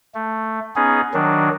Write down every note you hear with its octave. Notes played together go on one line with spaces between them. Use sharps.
A3
B3 C#4 D#4 G#4
D#3 F#3 D4